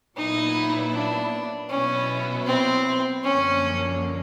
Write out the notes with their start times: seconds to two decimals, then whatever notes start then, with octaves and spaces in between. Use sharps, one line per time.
0.16 A#2 F#3 B3 D#4 E4
0.93 D4
1.70 B2 F#3 B3 C#4 E4
2.47 C4
3.24 F#2 D3 F3 A#3 C#4